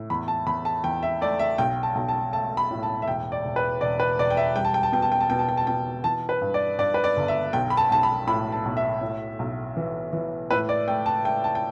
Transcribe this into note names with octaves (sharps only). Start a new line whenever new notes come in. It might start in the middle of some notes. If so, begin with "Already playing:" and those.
Already playing: A2
E2 B5
A5
E2 B5
A5
E2 G5
E5
A3 D5
E5
B1 G5
A5
B1
A5
A3 A5
B5
A2
A5
E5
E1 G5
D5
E1
B4
E1 D5
B4
E1 D5
G5
E5
G3 G5
A5
G5
A5
B2 G5
A5
G5
A5
B2 G5
A5
G5
A5
B2 G5
E3 A5
B4
G2
D5
G2 D5
B4
D5
G1
E5
B1 G5
B5
A5
B1 A5
B5
A2 B5
A5
B1
E5
A2
B1
E3
E3
A2 B4
D5
A3 G5
A5
A3 G5
A5
G5